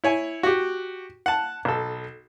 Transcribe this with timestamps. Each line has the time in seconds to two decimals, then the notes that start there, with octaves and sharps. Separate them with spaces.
0.04 E4 C#5 G#5
0.43 F#4 G4
1.26 F#5 A5
1.65 B1 A4